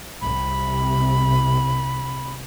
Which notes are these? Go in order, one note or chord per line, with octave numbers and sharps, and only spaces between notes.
C2 C3 B5